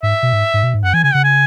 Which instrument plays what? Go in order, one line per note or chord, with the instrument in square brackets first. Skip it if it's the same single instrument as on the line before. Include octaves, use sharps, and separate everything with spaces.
[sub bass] G#2 [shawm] E5
[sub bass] B2
G#2
G#2
B2
G#2
[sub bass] F#2 [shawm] F#5
[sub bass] E3 [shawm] G#5
[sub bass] C#3 [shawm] G#5
[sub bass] C#3 [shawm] F#5
[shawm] G#5